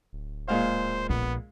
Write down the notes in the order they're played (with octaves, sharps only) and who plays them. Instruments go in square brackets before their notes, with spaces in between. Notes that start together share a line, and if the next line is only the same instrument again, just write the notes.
[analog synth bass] D1
[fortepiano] A#2 G#3 F5 [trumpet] C5
[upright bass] A#1 [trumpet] B3